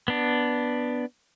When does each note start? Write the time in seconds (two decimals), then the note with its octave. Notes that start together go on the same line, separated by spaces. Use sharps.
0.08 B3 D4